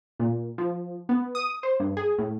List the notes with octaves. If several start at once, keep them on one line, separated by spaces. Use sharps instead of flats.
A#2
F3
B3
D#6
C5
G2
G#4
A2